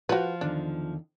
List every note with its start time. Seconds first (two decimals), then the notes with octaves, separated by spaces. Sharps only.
0.09 F3 F4 F#4 B4
0.41 E2 D3 D#3 D4